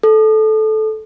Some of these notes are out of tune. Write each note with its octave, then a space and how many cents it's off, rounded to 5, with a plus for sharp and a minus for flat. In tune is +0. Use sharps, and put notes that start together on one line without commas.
A4 -15